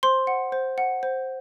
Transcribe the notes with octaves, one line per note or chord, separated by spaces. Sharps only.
C5 C6
F#5
C5
F#5
C5